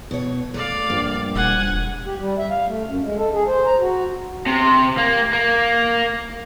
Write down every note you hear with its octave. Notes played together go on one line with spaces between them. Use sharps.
B2 C#5
A3 D5 F5
A#1 G2
E1 F#5 G#5
G4
G3
E5
F5
A3
F#2
G#3
A4
G#4
C5
A#5
F#4
C3
A#3
A#3